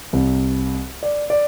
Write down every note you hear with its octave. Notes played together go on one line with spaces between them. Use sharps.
C2
D5
D5